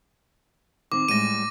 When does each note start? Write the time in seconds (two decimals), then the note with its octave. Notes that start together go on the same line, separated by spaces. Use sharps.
0.92 D#3 C4 D6
1.08 A2 G3 G#3 A#6 D#7